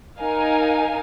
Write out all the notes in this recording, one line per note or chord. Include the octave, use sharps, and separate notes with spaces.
D#4 A#4 F5 G#5